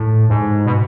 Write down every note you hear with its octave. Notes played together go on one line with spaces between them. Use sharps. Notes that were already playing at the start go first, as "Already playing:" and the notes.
Already playing: A2
G#2
B2